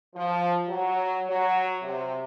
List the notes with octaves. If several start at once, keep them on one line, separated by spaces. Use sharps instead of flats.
F3
F#3
F#3
C3